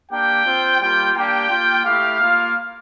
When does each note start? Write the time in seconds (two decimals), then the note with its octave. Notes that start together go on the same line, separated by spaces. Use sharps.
0.11 A#3 D4 G4 G5
0.46 C4 F4
0.81 G3 A#3 F4 G5
1.15 A#3 D4 G4 G5
1.50 A#3 F4
1.85 A3 E4 G4 F5
2.20 A#3 F4